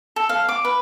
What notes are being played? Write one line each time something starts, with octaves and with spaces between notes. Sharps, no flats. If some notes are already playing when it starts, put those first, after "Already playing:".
A4
F5
D6
B4